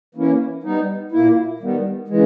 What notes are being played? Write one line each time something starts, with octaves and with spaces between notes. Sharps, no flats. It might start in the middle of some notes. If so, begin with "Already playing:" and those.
E3 A#3 C#4 E4
G3 B3 D#4
A#2 A#3 E4
D#3 G3 B3
C#3 E3 G#3